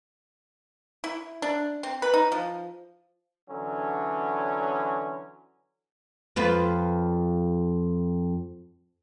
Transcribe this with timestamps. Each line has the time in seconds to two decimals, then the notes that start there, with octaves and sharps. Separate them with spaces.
1.04 E4
1.42 D4
1.83 C4
2.02 B4
2.14 D#4
2.32 F3
3.49 D3 E3 F#3 C#4
6.36 F2 F4 B4